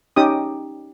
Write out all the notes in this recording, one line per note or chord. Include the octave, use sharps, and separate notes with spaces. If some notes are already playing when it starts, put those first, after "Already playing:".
C#4 D#4 G4 D#6